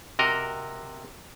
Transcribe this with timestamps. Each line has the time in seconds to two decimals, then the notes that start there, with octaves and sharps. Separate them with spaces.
0.19 C3 F#4 A#4 D#5